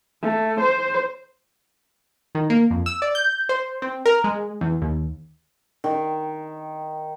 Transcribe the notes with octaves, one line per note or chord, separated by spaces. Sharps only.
A3
C5
D#3
A#3
F2
E6
D5
G6
C5
C4
A#4
G#3
E2
D#2
D#3